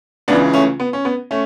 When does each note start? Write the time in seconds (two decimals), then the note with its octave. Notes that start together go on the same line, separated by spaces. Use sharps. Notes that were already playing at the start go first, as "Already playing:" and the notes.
0.28 C#2 C#3 E3 B3 D4
0.53 A3 C#4
0.80 B3
0.93 C#4
1.05 B3
1.31 A3 C#4